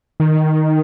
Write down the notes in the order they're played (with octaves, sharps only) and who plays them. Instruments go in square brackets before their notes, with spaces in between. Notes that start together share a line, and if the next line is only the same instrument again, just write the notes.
[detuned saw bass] D#3